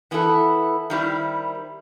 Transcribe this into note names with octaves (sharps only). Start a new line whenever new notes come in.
E3 B3 E4 A4
D#3 G3 C4 E4